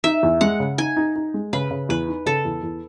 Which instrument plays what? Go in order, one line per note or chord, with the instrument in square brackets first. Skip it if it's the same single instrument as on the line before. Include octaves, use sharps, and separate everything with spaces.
[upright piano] D#4 [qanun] E5
[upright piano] E2
[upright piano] G#3 [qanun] F#5
[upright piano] C#3
[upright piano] D#4 [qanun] G#5
[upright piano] D#4
D#4
G#3
[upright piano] C#3 [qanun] B4
[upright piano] C#3
[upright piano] E2 [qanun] B4
[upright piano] D#4
[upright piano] C#3 [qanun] A4
[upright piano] E2
E2